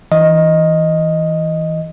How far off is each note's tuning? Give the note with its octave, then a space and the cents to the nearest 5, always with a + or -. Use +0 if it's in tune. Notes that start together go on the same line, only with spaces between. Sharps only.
E3 -15 D#5 +0